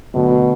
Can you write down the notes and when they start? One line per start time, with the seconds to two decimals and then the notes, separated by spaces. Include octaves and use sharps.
0.14 D2 B2 D3 F#3